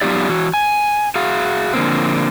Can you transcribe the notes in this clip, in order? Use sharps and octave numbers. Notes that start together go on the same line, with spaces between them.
F#3 B3 D#4 F4 G4 D5
E3 F#4
G#5
F#4 G#4 F5
D3 F3 A#3 C4